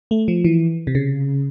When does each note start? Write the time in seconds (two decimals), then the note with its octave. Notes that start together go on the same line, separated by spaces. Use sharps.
0.11 A3
0.28 F3
0.44 E3
0.87 C3
0.95 C#3